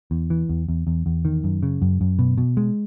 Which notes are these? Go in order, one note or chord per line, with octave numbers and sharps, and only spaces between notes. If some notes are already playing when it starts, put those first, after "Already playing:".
E2
E3
E2
E2
E2
E2
D#3
F#2
C#3
F#2
F#2
B2
B2
G#3